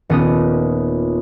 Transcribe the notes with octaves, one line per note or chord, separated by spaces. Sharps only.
D#1 B3 D#6